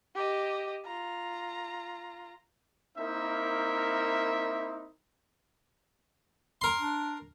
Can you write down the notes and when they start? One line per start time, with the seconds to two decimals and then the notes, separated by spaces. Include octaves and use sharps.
0.15 G4 D#5
0.85 F4 A#5
2.96 A#3 C4 D#4 E4 A#4 E5
6.61 A#4 C6
6.79 D4